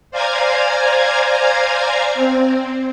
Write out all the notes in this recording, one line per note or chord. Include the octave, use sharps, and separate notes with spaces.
C5 D5 F5 G#5 A#5 G#6
C4